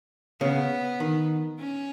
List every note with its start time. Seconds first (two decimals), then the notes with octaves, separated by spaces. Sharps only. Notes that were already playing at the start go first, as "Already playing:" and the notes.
0.41 C#3 B3
1.00 D#3
1.59 C#4